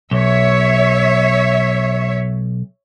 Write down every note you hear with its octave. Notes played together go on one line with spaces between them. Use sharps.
B1 C#5 E5